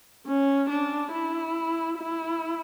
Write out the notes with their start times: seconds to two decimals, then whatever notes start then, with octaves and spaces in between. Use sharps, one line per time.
0.27 C#4
0.70 D4
1.13 E4
1.98 E4